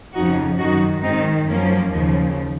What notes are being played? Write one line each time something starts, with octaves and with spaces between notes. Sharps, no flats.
F2 C#3 F3 D#4 F#4
F#2 D#3 D#4 F#4
G#2 D#3 C4 D#4
F#2 F3 A#3 C#4
D#2 C#3 F3